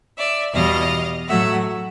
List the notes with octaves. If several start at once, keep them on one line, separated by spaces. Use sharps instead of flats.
D5 E5
E2 B2 G3 D#5 F5
A2 F#3 A3 E5 F#5